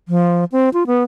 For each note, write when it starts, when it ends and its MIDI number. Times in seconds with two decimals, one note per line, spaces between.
0.08 0.45 53
0.52 0.69 60
0.74 0.87 65
0.87 1.03 59